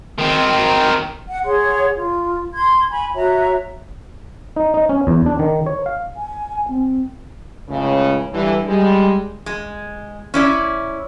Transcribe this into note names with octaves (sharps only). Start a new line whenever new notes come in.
D#3 C4
F#5
G#4 C#5 F#5 C6
F4
C6 G#6
G#5 B5 C#6
F#4 C#5 E5 A#5
D#4
D#4
C#4
E2
D4
D#3
C#5
F5
G#5
C4
C#2 A2 C#3
G2 D3 E3
G3 G#3
G#3
C#4 E4 D5